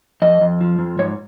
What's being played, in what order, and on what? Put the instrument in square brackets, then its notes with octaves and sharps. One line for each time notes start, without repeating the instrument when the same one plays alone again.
[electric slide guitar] F2 D#5
F2
F3
F2
G#2 C#5